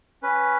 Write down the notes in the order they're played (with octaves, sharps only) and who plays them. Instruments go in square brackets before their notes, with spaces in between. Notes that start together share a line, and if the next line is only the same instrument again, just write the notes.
[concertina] C#4 B4